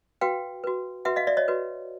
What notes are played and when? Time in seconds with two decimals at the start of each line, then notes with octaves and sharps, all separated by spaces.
0.21 F#4 B4 F5 G5
0.64 F#4 B4
1.05 F#4 B4 E5 F#5
1.16 D#5 F5
1.27 D5 E5
1.37 C#5 D#5
1.48 F#4 B4